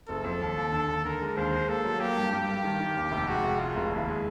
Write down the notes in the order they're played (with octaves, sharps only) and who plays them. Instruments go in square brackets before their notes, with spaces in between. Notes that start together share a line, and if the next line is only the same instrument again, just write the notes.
[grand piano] F#1 [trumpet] A4
[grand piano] F2
D#2
D#2
D3
D#2
[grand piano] D3 [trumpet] A#4
[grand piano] G#3
[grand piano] D#2 [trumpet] C5
[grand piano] G#3
[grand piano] A#3 [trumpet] A4
[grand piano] F#3
[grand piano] A#3 [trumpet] G4
[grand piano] G2
[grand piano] G2 [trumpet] G4
[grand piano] G2
D#3
D#3
D#2
F1
[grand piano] G#3 [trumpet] F#4
[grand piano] F1
[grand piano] G#3 [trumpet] F4
[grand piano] F1
[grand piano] D#2 [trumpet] E4
[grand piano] G#3